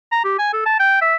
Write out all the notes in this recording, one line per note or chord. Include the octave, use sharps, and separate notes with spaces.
A#5
G4
G#5
A4
A5
G5
E5